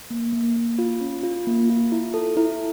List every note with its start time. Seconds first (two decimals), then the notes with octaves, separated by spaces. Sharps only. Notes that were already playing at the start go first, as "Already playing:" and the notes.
0.10 A#3
0.33 A#3
0.56 A#3
0.79 F4
1.01 C#4
1.23 F4
1.47 A#3
1.70 F4
1.92 E4
2.14 A4
2.37 E4